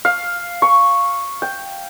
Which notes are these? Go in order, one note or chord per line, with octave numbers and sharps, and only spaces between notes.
F5
C#6
G5